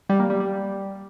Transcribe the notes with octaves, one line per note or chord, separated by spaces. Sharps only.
G3
A#3
G3
G3